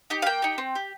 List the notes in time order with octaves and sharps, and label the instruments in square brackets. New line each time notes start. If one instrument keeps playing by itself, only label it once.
[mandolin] D#4 G4
F5
A#3 G5
D#4 G4
C4
G4